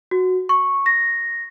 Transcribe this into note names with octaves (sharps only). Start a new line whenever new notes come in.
F#4
C#6
A#6